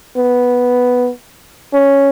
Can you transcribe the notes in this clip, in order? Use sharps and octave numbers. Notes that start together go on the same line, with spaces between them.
B3
C#4